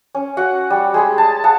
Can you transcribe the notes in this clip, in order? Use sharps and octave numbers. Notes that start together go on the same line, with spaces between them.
C#4
F#4 F#5
G3
G#3 G#4 B5
A5
G#4 F#5 A5